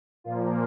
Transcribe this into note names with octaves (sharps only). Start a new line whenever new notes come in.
A#2 F3 A#3 F4